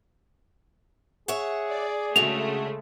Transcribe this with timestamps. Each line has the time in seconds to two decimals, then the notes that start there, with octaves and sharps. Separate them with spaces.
1.28 G#4 C#5 E5 F#5
1.68 D5
2.16 C#3 G#3 A3 D4 F#4 F7